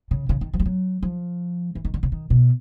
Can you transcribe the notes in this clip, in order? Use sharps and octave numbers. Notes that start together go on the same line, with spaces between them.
C#3
C#3
D#3
F3
G3
F#3
F3
E3
D#3
D3
C#3
D#3
B2